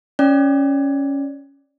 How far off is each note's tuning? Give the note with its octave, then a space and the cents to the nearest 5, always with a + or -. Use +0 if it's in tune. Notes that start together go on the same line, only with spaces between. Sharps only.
C#4 +0 D5 +0